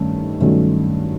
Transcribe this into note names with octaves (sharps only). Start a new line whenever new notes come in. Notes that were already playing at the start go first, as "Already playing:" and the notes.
Already playing: G2 D#3 A3 C#4
G2 D#3 F#3 A3 C#4